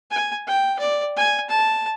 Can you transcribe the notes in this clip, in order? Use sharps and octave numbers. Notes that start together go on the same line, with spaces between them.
G#5
G5
D5
G#5
A5